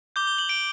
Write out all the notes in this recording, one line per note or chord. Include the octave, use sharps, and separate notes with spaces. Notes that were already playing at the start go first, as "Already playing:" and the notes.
D6 G6 G7
G7
F#7
D7